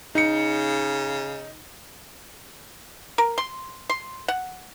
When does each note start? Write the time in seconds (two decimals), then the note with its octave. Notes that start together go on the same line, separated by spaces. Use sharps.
0.15 C#3 D#4 C#7
3.18 A#4
3.38 C6
3.89 C6
4.28 F#5